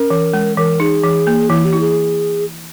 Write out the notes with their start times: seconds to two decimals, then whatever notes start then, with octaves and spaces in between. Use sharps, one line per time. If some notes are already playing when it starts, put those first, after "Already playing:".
Already playing: C#4 A#4
0.10 E3
0.33 G#3
0.57 E3 A#4
0.80 D#4 G#4
1.04 E3
1.27 A#3
1.49 E3 E4
1.65 G4
1.73 E4
1.80 G#4